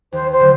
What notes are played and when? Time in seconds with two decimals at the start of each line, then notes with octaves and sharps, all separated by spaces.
0.12 D#2 C5
0.31 C5
0.40 D3 F#3